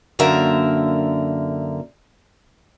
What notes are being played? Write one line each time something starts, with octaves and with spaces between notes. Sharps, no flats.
F#2 D3 A#3 A#4 E5